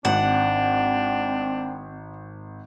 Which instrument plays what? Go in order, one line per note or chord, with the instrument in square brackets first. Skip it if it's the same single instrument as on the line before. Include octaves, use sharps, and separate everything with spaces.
[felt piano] G#1 [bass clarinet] C4 [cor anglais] D4 [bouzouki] F#5